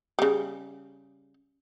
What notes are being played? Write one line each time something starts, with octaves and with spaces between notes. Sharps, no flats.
C#3 G3